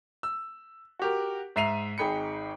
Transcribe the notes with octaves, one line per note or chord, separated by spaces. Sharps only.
E6
F#4 G4 A#4
G#2 E5 C7 D#7 F7
G#1 D#4 G#4 G5 B5 C#7